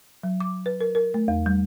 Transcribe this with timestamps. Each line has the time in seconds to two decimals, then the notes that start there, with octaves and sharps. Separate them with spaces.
0.23 F#3
0.40 D6
0.66 B4
0.81 A#4
0.95 A#4
1.14 A3
1.28 E2
1.46 G3